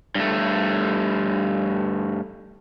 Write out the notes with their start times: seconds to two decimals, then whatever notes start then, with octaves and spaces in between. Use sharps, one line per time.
0.15 G2 A3